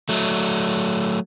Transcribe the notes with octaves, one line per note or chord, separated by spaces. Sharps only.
F#3 A3